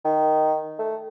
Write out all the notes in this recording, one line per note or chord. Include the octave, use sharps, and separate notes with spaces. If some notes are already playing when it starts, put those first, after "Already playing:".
D#3
A3